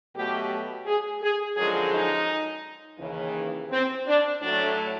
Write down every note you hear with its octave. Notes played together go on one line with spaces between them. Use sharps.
B2 F#3 A3 G4
G#4
G#4
F#2 D3 F3 G#3 G#4
D#4
D#2 C#3 E3
C4
D4
A2 F#3 A3 D4